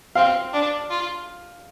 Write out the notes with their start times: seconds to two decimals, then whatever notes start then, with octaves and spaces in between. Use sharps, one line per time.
0.15 C4 F5
0.53 D4
0.90 F4